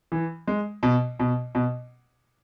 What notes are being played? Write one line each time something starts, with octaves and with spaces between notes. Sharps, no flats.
E3
G#3
B2
B2
B2